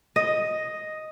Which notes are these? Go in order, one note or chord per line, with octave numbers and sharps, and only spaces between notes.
D#5